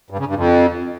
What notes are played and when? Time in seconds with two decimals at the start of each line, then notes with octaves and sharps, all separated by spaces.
0.10 G2
0.19 C#3
0.27 G2
0.35 F2